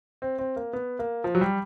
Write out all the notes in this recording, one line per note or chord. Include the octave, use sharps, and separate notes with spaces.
C4
C4
A#3
B3
A#3
F3
F#3
G3